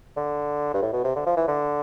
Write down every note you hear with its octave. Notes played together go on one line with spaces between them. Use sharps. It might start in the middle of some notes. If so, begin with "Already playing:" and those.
D3
G2
A2
B2
C3
D3
F3
E3
D3